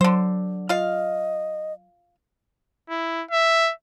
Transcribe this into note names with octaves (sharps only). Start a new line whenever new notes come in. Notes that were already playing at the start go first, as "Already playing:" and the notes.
D3 F#3 C5
F4 D#5 F5
E4
E5